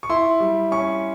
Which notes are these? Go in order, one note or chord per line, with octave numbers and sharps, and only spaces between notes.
C#6
E4 C6
G3
C#4 C#6